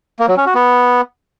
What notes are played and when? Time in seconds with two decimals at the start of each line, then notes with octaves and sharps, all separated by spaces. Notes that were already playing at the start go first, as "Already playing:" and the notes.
0.20 A#3
0.28 F#3
0.37 C#4
0.46 F#4
0.55 B3